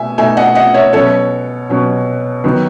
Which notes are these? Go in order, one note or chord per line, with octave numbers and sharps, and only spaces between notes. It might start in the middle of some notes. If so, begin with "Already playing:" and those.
Already playing: B2 A3 E5 G#5
B2 A3 D#4 E5 G#5
D#5 F#5
D#5 F#5
C#5 E5
B2 F#3 C#4 A4 C#5
B2 F#3 C#4
D#3 F#3 B3